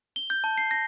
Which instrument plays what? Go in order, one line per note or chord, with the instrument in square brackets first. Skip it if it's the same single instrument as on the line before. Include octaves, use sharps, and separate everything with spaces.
[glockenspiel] G7
G6
A5
C7
A#6